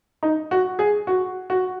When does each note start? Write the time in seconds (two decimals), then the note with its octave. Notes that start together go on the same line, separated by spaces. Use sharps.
0.23 D#4
0.51 F#4
0.79 G#4
1.07 F#4
1.50 F#4